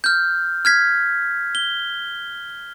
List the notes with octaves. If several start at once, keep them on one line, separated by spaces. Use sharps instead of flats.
F6 G6
F6 G#6 B6
G7